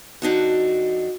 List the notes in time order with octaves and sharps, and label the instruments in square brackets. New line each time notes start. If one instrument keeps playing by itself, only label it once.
[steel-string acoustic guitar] F2 D4 D#4 F#4